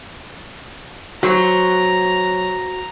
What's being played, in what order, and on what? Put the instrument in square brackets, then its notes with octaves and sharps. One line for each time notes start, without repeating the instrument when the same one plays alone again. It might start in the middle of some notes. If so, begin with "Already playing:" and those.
[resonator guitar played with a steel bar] F#3 [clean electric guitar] F#4 C5 [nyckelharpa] A#5